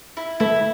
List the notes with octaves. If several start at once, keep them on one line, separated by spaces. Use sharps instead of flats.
E4
A3 E4